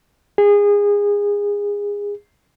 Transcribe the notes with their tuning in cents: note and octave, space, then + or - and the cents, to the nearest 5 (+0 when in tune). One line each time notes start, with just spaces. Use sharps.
G#4 -25